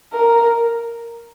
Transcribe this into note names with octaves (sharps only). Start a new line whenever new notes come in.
A#4